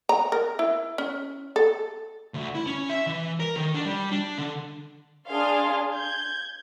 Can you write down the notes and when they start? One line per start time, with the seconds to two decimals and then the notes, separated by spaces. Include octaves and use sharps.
0.09 A#5
0.32 A#4
0.59 E4
0.98 C#4
1.56 A4
2.34 D2
2.55 E4
2.67 C#4
2.90 E5
3.07 E3
3.40 A#4
3.56 D#3
3.74 D4
3.86 G3
4.12 D4
4.38 D3
5.28 D4 G#4 F5 C6
5.93 G6 G#6